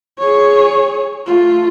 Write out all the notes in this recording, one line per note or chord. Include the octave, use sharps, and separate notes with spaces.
G#4 C#5
A3 F4